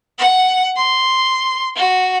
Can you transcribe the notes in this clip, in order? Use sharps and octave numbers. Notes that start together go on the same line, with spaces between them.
F#5
C6
F#4